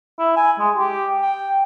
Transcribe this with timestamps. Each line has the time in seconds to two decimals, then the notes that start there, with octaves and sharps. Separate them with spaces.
0.19 E4
0.36 G#5
0.59 G#3
0.77 G4
1.22 G5